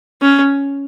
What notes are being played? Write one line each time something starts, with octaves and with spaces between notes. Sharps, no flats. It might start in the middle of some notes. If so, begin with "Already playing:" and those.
C#4